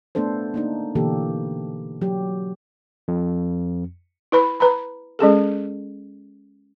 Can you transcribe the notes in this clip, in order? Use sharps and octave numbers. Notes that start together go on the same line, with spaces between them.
A3 B3 D4 A4 C5
A#3 D4 D#4
B2 D3 E3 A#3 G4 A4
F#3 G4
F2
E4 B4 B5
B4 A#5 B5
G#3 C#4 G#4 A4